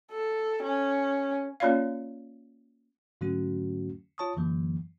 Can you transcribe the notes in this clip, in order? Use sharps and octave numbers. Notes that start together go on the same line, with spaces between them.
A4
C#4
A#3 C#4 F4 C#5 D5 F5
G#2 D3 F#3 A3 C#4 F#4
F4 C#5 A5 C#6 D#6
F#2 D3 E3 F#3 A#3